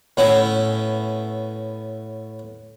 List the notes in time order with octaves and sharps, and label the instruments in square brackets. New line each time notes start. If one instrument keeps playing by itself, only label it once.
[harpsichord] A2 B3 C#4 E4